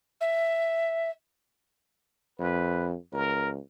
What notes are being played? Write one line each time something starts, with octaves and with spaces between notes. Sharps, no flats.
E5
F2 B4
C#2 A#4